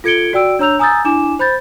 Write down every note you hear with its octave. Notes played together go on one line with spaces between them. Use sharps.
F4 A4 G#6 C#7 D7 G7
F#4 D5 G5 E6 D7
D4 C#5 A#5 E6 G6 F7
G#5 A#5 D#6 E6 G6 A6
D4 E4 G#5 D6 E7
C5 B5 G6 A6